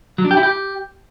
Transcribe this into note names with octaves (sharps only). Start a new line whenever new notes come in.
F#3
D4
G4
E4
G4